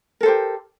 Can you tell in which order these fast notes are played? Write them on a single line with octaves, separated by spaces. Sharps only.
A#4 A4 C5 G4